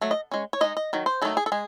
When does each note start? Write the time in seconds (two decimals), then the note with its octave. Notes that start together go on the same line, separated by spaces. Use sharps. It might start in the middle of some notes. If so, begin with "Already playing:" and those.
0.01 F#3 A3
0.11 D#5
0.31 G#3 C#4
0.53 C#5
0.61 G#3 D#4 D#5
0.77 D#5
0.93 D#3 F#3
1.06 C5
1.22 D#3 F#3 A3 D#4 A4
1.37 G#4
1.46 A4
1.52 G#3 G#4